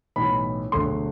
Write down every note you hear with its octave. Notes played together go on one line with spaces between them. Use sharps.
B1 A2 E3 B5
E1 D2 D3 F#3 A3 C6